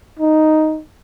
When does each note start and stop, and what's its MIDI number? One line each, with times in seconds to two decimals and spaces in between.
0.19 0.81 63